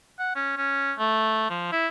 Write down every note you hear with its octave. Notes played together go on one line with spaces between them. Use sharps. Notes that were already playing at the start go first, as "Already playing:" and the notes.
F#5
C#4
C#4
A3
F3
E4